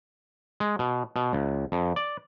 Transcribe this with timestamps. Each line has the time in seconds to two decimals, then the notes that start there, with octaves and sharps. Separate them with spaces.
0.60 G#3
0.79 B2
1.16 B2
1.33 C#2
1.72 F2
1.96 D5